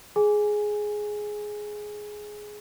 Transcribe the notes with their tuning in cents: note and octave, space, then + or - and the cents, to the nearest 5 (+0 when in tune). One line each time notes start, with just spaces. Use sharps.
G#4 +10 G#5 -5